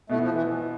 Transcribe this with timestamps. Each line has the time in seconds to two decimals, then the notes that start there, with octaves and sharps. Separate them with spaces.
0.09 B2 A3 B3 E4
0.21 F3
0.34 E3